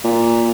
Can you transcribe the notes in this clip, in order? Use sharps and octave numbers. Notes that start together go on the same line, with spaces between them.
A#2